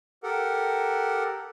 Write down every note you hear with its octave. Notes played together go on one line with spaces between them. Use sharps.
G4 A4 A#4 F#5